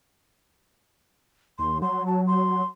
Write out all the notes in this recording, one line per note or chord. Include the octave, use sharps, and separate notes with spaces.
D#2 C6
F#3 C6
A5
C6